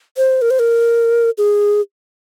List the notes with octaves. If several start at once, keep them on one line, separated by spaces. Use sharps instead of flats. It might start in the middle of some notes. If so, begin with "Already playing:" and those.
C5
A#4
C5
A#4
G#4